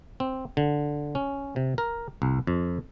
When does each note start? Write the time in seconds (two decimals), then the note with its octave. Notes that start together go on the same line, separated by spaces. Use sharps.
0.20 C4
0.57 D3
1.15 C#4
1.56 C3
1.78 A#4
2.22 C2
2.47 F2